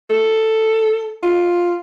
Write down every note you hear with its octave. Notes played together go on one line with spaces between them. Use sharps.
A4
F4